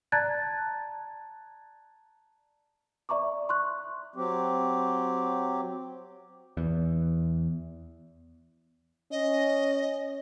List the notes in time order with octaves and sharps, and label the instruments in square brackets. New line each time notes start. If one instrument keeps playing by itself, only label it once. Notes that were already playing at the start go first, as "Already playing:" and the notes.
[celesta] D5 A5 A#5 F#6 G#6 A6
D5 E5 A#5 C#6 D6
C6 C#6 F#6
[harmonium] F#3 C4 G4
[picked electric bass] E2
[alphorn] C#4 [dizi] D#5